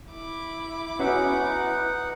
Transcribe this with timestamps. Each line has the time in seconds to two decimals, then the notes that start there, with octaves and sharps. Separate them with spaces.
0.12 E4 D6
0.99 B3 C#4 D#4 F#4 E5 F#5